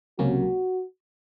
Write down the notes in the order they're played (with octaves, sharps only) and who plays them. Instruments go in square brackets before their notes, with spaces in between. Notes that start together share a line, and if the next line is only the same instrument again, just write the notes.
[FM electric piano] C#2 C3 F#3 A#3 C#4 [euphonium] F#4